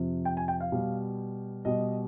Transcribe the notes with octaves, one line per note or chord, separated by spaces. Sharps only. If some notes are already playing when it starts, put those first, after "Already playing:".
Already playing: F2 C3 F3
G5
G#5
G5
F5
B2 G3
B2 G3 D#5